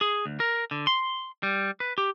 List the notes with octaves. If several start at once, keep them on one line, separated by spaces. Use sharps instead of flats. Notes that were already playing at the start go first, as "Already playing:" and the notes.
G#4
D2
A#4
D3
C6
G3
B4
G4